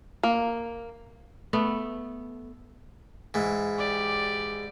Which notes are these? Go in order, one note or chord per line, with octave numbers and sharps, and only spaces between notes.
A#3
A3 B3
G#2 E3
G4 D5